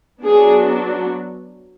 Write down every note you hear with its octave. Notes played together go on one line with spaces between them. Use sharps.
F#3 B3 D4 G#4